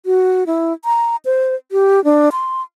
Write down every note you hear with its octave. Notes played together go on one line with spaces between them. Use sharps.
F#4
E4
A#5
C5
G4
D4
C6